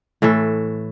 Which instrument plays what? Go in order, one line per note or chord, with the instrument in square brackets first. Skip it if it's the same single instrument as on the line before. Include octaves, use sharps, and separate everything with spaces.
[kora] A2 E3 A3 A4